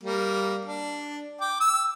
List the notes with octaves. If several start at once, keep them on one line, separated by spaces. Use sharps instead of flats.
G3 A#3
D4
G5 D6
E6